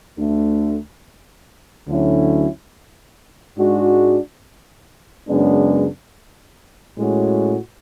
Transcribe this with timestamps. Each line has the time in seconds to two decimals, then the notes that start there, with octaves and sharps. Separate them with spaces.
0.18 D2 D3 A3
1.88 D2 D3 F#3 C#4 E4
3.58 G#2 G#3 D4 F#4
5.27 F#2 C#3 G#3 B3 D4
6.98 A2 G#3 C#4 F#4